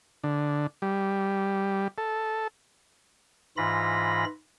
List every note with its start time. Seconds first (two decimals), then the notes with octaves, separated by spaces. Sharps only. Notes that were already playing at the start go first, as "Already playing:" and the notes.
0.24 D3
0.82 G3
1.98 A4
3.57 G#2 E3 F4 B5 A#6